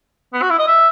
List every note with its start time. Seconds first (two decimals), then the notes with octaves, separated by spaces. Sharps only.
0.34 B3
0.42 F#4
0.50 E4
0.59 D#5
0.67 E5